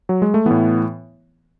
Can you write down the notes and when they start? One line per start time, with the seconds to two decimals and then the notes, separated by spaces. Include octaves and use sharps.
0.09 F#3
0.22 G#3
0.34 A3
0.46 A2 E3 B3